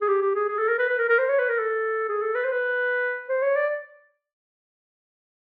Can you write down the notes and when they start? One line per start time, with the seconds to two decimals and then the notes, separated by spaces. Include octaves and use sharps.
0.02 G#4
0.08 G4
0.22 G4
0.35 G#4
0.49 G#4
0.59 A4
0.69 A#4
0.79 B4
0.89 B4
0.99 A#4
1.09 A#4
1.19 C5
1.29 C#5
1.39 B4
1.49 A#4
1.59 A4
2.09 G#4
2.22 A4
2.35 B4
2.44 C5
2.52 B4
3.29 C5
3.42 C#5
3.56 D5